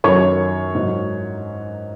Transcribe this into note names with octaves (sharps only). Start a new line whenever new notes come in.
F#2 D#3 F#3 C#5 C#6
G#2 F#3